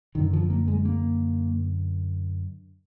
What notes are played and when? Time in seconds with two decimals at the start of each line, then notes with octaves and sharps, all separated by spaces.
0.15 F#2 D3 D#3
0.33 F3
0.50 A#3
0.68 G#3
0.85 A#3